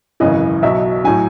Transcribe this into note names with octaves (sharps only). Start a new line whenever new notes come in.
G#1 F#2 C#3 E3 D#5
B1 B2 F#3 E5
A2 F#3 G#5